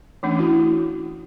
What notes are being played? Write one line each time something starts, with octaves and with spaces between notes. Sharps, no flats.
E3 A3 C#4 D4
E4 F#4